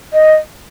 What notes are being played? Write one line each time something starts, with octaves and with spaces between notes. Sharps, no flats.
D#5